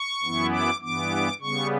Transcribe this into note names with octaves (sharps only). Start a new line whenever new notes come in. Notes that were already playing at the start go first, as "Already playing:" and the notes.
Already playing: C#6
F#2 E3 B3 E4
D6
G2 E3 B3 D6
C#3 G3 B3 C#6